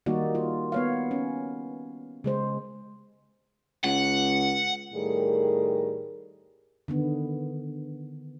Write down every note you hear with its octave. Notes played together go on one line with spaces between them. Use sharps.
D#3 G3 A#3 D#4 F#4 D5
F4
B3 C#5 F5
C#4
C#3 G#3 C5
C#2 F#5
A2 D#3 G3 G#4 A#4
D3 D#3 B3